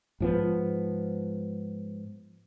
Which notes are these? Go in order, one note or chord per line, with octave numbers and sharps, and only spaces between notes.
G#2 F3 B3